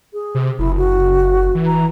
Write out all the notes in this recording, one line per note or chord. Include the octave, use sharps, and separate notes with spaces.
G#4
C3
F#1 E4
F#4
E3
A#5